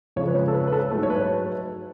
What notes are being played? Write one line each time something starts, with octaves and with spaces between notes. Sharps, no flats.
F2 C#3 F3 G#3 C#5
B4
C#5
A4
B4
B4
A4
G#2 F#3 A3 A4
C#5
B4